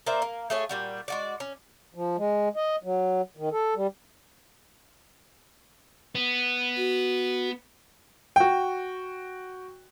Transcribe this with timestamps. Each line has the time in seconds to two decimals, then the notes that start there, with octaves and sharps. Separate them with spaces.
0.07 A#3 C5 D5 E5
0.22 A#3
0.50 A3 G#4 C#5
0.69 A#2 G3 F#4
1.08 G#3 F#4 D5
1.40 C#4
1.95 F3
2.18 G#3
2.56 D#5
2.83 F#3
3.37 D#3
3.52 A4
3.76 G3
6.15 B3
6.77 F#4
8.36 F#4 G5